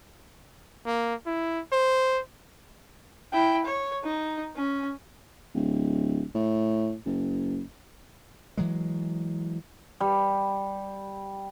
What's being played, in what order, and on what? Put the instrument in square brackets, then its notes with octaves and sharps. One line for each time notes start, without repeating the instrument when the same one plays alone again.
[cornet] A#3
E4
C5
[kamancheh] E4 G5
C#5
D#4
C#4
[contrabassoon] D1
A2
F#1
[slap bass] E3 F#3 G#3
[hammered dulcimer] G3